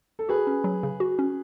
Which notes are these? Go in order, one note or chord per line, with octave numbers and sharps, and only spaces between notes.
A4
F#4 G#4 B4
C#4
F#3
C#3
F#4
C#4